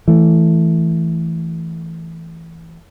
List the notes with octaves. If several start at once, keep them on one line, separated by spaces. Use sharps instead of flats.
E3 A3